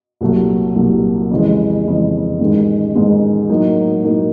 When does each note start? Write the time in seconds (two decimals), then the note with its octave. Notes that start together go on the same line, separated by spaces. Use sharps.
0.21 C2 A#2 F#3 A3
0.75 C2 A#2 F#3 A3
1.31 F2 C#3 E3 G#3
1.85 F2 C#3 E3 G#3
2.40 A1 G#2 D#3 G#3
2.95 A1 G#2 D#3 G#3
3.49 A2 F#3 A#3 D#4
4.04 A2 F#3 A#3 D#4